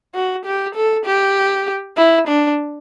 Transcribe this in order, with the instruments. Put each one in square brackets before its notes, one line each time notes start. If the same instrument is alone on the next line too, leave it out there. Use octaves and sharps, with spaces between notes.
[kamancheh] F#4
G4
A4
G4
E4
D4